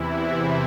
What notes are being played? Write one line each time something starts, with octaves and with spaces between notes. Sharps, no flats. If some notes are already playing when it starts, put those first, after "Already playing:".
Already playing: E2 C3 E3 E4
C4